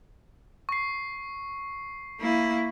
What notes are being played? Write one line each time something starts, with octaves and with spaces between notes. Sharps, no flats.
C#6 C7
A#3 E4